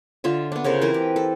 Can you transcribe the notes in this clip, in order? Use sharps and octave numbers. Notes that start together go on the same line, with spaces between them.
D3 F4 E5
B3 D4
C#3 A4 A#4 C5
E3 C4 A#4 B4
G4
A4